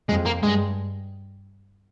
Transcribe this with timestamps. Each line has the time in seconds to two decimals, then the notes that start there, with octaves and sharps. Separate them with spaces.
0.09 F2 G#3
0.26 A#3
0.43 G2 G#3